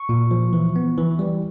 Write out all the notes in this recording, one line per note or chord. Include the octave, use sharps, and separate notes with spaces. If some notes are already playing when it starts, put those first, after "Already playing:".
Already playing: C#6
A#2
F3
E3
B3
E3
G3